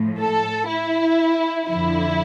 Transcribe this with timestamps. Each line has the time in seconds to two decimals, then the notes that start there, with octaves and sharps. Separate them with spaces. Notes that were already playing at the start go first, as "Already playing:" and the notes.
Already playing: A2 F3
0.19 A4
0.68 E4
1.67 F2 D3 F3 E4